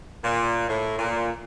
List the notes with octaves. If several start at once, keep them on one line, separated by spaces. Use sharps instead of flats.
A#2
A2
A#2